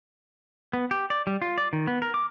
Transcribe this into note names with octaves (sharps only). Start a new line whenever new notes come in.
B3
G4
D5
G3
F4
D5
D#3
B3
A#4
D6